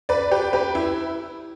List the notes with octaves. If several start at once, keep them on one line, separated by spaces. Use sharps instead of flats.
B4 D5
G4 B4
G4 B4
E4